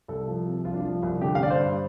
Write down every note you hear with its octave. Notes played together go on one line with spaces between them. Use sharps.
C2 A4
F3
C3
C2 F4
D4
F3 F4
C2
D3 G4
F5
D3 D5
C5
G2